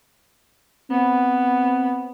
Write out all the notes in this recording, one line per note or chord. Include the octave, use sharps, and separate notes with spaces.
B3 C4